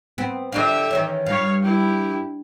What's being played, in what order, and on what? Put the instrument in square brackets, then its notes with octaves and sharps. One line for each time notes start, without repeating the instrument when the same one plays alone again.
[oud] B3 C4
[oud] D3 D4 F4 [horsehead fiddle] G4 E5
[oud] D#3 E3 C#4
[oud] G2 [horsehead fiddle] C#5 F5
[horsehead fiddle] E4 G4